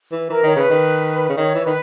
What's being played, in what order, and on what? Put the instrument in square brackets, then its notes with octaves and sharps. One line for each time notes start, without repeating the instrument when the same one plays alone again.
[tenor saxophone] E3
[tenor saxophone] E3 [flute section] A#4
[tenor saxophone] D#3 [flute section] C#5
[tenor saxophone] C#3 [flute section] B4
[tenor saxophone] D#3
C#3
[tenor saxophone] D#3 [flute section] C#5
[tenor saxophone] E3
[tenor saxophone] D#3 [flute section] B4